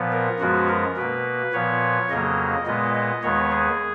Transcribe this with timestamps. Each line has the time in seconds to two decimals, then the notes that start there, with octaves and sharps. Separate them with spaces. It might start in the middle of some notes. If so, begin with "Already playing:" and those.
Already playing: A#2 F3 B3
0.12 A#4
0.40 F#2 F3 G#3 B3 F#4
0.68 A#4
0.97 B2 A#3 B4
1.53 A#2 F3 B3 C#5
2.10 F2 C#3 F#3 A#3 D#5
2.66 A#2 G#3 B3 D#5
2.94 D#5
3.23 D#2 D#3 G#3 B3 C#5
3.52 G#4